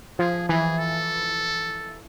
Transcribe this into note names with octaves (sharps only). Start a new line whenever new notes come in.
F3 G#4
E3 G#4
A4